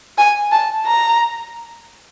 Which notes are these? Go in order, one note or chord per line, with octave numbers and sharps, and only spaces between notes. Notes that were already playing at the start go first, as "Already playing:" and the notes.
G#5
A5
A#5